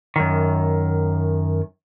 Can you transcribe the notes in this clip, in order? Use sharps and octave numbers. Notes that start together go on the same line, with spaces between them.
F#2 D#3